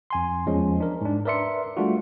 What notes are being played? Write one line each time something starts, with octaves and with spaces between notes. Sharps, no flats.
F2 G#5 C6
E2 F3 G#3 C#4
D4 A#4
G#2 D4
A#4 B4 D5 E5 C6 C#7
G3 A3 D4 F4 F#4